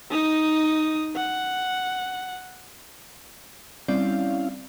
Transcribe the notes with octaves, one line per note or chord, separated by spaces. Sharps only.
D#4 D#6
F#5
G3 C4 C#4 E4 D5 F5